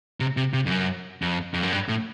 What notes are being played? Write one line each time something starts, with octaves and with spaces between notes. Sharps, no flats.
C3
C3
C3
F2
F#2
F2
F2
F#2
G2
A2